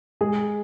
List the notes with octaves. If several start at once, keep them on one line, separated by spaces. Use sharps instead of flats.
G#3 G#4